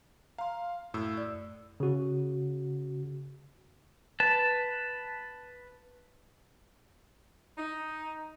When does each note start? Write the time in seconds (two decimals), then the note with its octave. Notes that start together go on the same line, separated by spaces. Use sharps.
0.38 F5 A#5 C6
0.94 F#2 A2 E6
1.17 D5
1.80 C#3 F#4
4.20 B4 A5
7.58 D#4